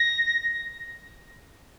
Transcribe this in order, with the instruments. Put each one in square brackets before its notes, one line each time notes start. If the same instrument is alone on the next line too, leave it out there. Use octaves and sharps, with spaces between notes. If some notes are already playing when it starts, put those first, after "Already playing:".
Already playing: [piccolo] A#6